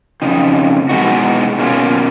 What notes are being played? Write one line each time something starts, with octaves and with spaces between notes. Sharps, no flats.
F2 C#3 D#4
B2 G#3 D#4 F#4
B2 A#3 C#4 F4